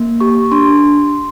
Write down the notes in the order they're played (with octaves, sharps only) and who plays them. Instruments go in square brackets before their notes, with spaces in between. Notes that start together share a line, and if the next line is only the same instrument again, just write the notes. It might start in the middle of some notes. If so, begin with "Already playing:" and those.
Already playing: [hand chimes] A#3
G4 C#6
D4 C6